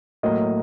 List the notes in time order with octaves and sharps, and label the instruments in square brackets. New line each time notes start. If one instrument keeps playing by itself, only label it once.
[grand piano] A2 F#3 A#3 D#5